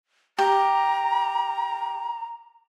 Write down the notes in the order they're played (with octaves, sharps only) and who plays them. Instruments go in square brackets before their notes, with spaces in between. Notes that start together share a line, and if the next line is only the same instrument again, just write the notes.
[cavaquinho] G4 [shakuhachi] A#5